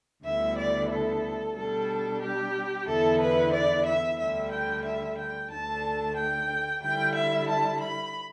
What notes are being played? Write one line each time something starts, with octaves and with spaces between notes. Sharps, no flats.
D2 D3 G3 B3 E4 E5
D5
A4
B2 G3 D4 A4
G4
E2 D3 B3 E4 A4
B4
D5
E5
D2 D3 G3 E5
G5
E5
G5
D2 D3 A3 D4 A5
G5
D3 G3 E4 G5
E5
A5
B5